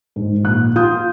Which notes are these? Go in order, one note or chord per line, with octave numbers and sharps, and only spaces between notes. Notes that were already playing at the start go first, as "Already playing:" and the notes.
G#2
A#1 F#6
F4 D#6 G6